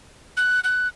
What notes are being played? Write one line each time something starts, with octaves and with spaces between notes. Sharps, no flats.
F#6
F#6